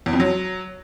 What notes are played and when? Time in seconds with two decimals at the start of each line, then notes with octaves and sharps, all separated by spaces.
0.06 E2
0.13 F2
0.20 F#3